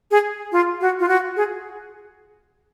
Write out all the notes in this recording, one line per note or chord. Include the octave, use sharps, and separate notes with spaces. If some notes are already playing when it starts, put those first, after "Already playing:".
G#4
F4
F#4
F4
F#4
G#4